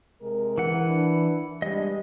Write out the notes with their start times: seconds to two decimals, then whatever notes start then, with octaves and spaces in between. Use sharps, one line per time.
0.22 C3 G#3 A#4
0.58 E3 F#5
0.86 D4 B4
1.62 G3 G#3 D4 D#5